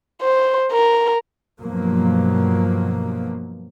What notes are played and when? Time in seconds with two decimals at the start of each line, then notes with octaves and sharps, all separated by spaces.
0.22 C5
0.72 A#4
1.60 G2 B2 F3 F#3 A#3